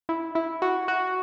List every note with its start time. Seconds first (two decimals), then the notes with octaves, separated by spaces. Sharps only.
0.09 E4
0.35 E4
0.62 F#4
0.88 F#4